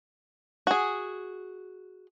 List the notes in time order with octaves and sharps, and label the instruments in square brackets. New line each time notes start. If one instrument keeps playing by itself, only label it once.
[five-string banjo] F#4 G#4